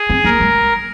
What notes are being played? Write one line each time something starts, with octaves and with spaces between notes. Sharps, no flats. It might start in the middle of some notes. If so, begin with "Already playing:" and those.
Already playing: G#4
C4
A#3 A#4
G#3